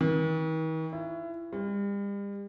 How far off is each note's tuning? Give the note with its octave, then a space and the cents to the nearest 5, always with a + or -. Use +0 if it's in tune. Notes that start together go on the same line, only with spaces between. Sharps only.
D#3 +45
E4 +30
G3 +40